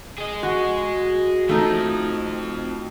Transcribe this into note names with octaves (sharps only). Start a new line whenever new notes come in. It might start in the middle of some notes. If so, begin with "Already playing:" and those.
G#4 D#5
F#4
F2 F3 A3 D#4